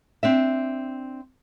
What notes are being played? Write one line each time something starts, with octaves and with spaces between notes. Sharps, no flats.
C4 D4 E5